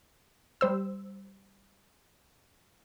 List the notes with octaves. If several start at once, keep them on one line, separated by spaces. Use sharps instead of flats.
G3 C5 E6